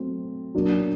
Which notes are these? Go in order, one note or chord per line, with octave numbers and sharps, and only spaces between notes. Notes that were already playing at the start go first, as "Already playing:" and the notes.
Already playing: F#3 A3 C4
F#3 A#3 D4